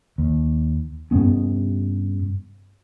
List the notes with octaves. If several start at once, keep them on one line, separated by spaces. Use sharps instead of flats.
D#2
G2 C3 B3 C#4